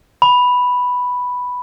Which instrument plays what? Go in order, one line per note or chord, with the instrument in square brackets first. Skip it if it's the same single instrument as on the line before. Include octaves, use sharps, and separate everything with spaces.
[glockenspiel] B5